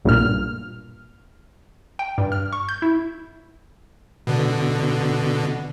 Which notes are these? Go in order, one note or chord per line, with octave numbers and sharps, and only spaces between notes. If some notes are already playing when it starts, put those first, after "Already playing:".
B1 G2 A#2 F6
G5
G2
F6
C#6
G6
E4
B2 D3